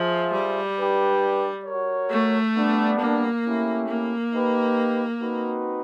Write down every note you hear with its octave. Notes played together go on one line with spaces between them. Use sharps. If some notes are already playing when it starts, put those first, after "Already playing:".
Already playing: F3 F4 G#4 C5 E5
G3
D4 G4 B4
F#4 A#4 C#5
A3
G3 B3 D4
A#3
A3 C#4 E4 G4
A#3
D#4 G4 B4
C4 D#4 F#4 B4